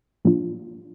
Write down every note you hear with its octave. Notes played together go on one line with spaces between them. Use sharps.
A2 F3 A#3 D4 F4